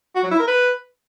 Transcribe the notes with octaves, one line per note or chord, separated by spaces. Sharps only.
F#4
F#3
E4
A#4
B4